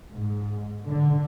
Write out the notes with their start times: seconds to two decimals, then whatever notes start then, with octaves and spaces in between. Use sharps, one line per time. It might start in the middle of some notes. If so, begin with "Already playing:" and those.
0.12 G#2
0.88 D3